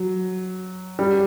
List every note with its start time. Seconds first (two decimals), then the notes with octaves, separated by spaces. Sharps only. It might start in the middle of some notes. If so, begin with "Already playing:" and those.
Already playing: F#3
0.99 G3